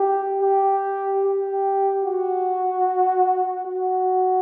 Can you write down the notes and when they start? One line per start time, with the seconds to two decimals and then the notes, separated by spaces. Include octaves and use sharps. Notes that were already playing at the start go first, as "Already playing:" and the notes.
Already playing: G4
0.42 G4
1.23 G4
2.04 F#4
3.66 F#4